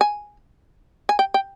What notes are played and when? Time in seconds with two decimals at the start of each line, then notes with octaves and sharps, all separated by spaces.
0.01 G#5
1.09 G#5
1.19 G5
1.34 G5